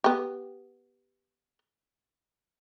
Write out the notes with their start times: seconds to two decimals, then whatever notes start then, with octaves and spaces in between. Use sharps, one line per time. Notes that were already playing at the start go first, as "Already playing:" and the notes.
0.04 B3 G4